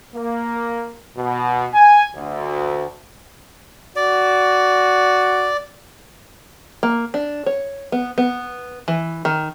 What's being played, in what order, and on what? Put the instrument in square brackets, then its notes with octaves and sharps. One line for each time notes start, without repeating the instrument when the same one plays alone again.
[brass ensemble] A#3
B2
G#5
D2
[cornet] F#4 [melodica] D5
[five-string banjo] A#3
D4
C#5
B3
B3
E3
D#3